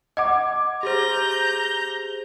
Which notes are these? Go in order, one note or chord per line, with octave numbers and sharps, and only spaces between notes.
D#5 F#5 D6 G#6
G4 G#4 C5 A#5 G6